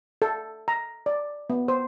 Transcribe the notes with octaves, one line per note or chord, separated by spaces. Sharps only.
A4
A#5
D5
B3
C5